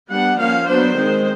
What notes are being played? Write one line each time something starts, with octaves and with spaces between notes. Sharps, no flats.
G3 B3 D4 F#5
F3 A#3 C#4 F5
F#3 B3 D4 C5
D#3 G#3 C4